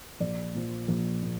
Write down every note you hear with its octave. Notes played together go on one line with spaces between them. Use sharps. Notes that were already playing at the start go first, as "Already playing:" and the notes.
A#1 D5
A#2 F3
A#1
A#2